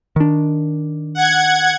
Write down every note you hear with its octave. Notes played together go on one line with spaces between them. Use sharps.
D#3 D4
F#5 G#6